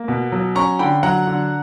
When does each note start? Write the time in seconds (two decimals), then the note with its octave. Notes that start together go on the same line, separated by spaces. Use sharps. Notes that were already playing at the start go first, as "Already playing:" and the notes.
Already playing: A#3
0.08 B2
0.32 F#3
0.55 C#4 A#5 C#6
0.79 D3 G5 B5
1.03 F#3 F#5 A#5
1.27 D3